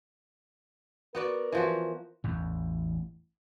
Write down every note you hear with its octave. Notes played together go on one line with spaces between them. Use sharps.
B3 F#4 A#4 D5
E3 F3 F#4
A1 E2